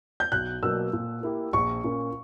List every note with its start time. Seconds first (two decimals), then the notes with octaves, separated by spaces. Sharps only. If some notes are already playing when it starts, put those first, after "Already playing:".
0.20 G6
0.32 B1 F#6
0.63 B2 F#3 A#3 E6
0.93 A#2
1.23 A#3 E4 G4
1.53 A#1 C#6
1.84 A#2 A#3 C#4